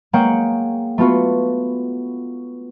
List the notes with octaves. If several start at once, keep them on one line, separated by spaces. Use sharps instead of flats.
G#3 A#3 C#5 F#5 G5
A3 B3 F4 F#4 B4